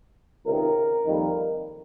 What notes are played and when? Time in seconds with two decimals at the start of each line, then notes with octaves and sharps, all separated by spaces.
0.46 C#2 C3 D#3 A#4
1.05 F2 D#3 G3 A#3